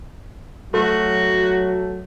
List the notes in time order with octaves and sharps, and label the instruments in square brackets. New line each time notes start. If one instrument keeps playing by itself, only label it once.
[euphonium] F#3 [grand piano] A3 [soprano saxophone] F#4